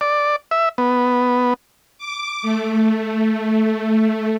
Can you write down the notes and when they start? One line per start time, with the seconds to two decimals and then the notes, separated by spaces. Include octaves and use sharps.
0.01 D5
0.51 E5
0.78 B3
1.98 D6
2.42 A3